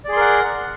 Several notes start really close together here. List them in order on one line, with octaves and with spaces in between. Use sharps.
D5 G#4 C6 A#4 F#5